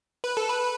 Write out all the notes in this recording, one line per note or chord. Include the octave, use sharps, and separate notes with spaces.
B4
A4
B4